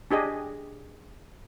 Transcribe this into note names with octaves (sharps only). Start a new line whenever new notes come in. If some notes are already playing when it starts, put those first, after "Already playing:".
D4 G4 G#4 D#5